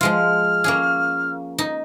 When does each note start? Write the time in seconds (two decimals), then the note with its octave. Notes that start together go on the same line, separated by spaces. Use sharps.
0.01 F3 G#3 F4 F6
0.64 A#3 C#4 G#4
1.58 D#4